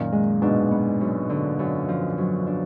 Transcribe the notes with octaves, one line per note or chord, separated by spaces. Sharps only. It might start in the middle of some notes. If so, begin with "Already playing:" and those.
Already playing: F#2 A#2 D#3
G#3
G#2 B2 D4
B3
F#2
D3
F#2
F3
F#3
D4